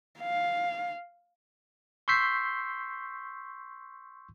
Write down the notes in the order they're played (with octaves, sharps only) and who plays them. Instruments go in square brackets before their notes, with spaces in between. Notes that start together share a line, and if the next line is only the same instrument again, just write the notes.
[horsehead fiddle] F5
[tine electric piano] C6 C#6 E6 G6 B6 C7